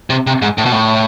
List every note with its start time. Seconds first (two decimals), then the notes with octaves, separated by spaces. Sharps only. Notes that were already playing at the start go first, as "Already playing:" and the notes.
0.10 C3
0.27 C3
0.42 G#2
0.58 A2
0.66 B2
0.72 A2